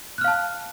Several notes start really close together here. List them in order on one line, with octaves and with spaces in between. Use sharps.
F#6 F6 F5 A5